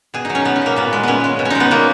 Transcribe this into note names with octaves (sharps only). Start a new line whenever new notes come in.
B2 G#4
F#3 D#4
C#4
B2 B3
C#4
F#3 A#3
A#2 B3
G#3
A#2 B3 C#4
G#3
B2
C#4
G#3 D#4
B3
B2 A#3